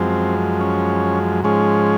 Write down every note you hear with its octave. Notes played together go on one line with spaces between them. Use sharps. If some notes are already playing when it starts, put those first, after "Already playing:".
Already playing: F#2 F3 G#3 C4
C#4
G#2 F3 G#3 C#4